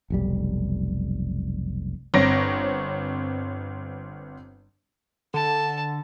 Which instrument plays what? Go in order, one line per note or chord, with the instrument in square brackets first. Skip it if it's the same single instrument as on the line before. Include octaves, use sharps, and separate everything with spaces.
[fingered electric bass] F1 B1 G3
[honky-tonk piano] G1 C4 C#5 A#6 D7
[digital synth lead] D3 [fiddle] A5